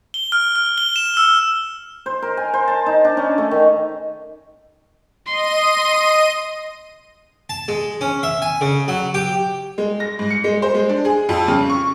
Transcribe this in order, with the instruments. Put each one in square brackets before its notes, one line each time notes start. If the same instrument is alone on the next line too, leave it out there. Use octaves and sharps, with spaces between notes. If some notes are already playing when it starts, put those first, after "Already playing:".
[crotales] G7
F6
F6
G7
E7
E6
[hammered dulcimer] C5
A#4
G#5
C5
A5
D#4
D4
C#4
A3
D#3
[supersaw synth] D#5 D#7 [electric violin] C6
[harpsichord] A5
G#3
C#4
E5
G#5
C#3
F#3
G4
[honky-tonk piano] G#3
A#6
G#2
C#7
G#3
C5
G#3
D4
G#4
F2
C#3
C#6